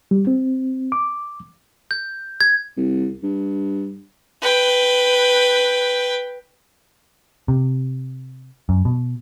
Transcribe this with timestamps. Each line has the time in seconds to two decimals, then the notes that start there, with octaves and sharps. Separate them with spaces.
0.11 G3
0.27 C4
0.92 D6
1.91 G6
2.41 G#6
2.77 C2
3.23 G2
4.42 B4 G5
7.48 C3
8.69 F#2
8.85 B2